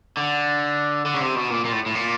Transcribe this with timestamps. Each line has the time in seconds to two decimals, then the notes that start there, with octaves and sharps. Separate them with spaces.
0.17 D3
1.06 D3
1.15 C#3
1.20 C3
1.35 B2
1.50 A#2
1.65 A#2
1.72 A2
1.86 A2
1.95 A#2